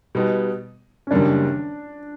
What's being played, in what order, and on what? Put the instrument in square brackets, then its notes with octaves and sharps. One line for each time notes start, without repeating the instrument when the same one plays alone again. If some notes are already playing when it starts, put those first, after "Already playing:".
[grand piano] B2 G3 B3 D#4
[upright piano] C#4
[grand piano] F#1 F#2 D#3 G3 A#3 [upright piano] D4